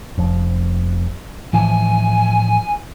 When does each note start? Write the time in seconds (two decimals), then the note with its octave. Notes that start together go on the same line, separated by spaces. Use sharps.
0.17 F1 F3
1.53 A2 E3 F3 G#5